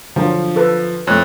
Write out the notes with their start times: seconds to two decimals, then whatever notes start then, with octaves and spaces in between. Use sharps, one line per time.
0.16 D3 F3 F#3 F4
0.56 A4 B4
1.07 F2 A3 C#5 F#6